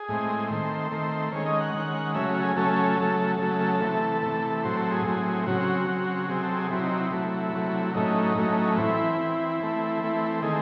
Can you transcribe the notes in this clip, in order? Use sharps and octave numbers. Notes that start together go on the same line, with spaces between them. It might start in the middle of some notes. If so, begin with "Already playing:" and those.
Already playing: G#4
A2 G#3 C4
D#3 A3 C4 C5
D#3 A3 C4
D#3 G#3 C#4 C#5
D#5
F#5
D#3 G#3 C#4
C#3 F#3 A3 C#4 E5
F#4
G#4
C#3 F#3 A3 C#4 A4
C#3 F#3 A3
C#3 F#3 A3 A4
A4
C3 E3 A3
C3 E3 A3
A2 F#3 C4 C5
A4
G#4
A2 F#3 C4
C#3 F#3 C4 F#4
C#3 F#3 C4
C3 F#3 C4 G#4
A4
G#4
C3 F#3 C4 E4
D#4
E4
C3 F#3 A3
C3 F#3 A3
A2 F#3 A3 C#4 D#4
A2 F#3 A3 C#4
E3 C4 E4
E3 C4
E3 A3 C4
E3 A3 C4
D#3 A3 C4 G#4